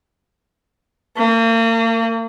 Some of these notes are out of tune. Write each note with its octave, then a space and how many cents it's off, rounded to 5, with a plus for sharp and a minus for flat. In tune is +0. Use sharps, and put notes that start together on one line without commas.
A#3 -40